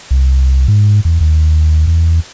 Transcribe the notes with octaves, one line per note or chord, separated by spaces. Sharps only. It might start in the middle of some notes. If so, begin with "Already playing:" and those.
C2
G#2
E2
D#2
E2